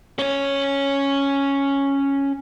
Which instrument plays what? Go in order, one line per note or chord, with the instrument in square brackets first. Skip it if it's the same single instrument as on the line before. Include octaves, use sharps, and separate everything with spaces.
[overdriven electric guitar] C#4 C#5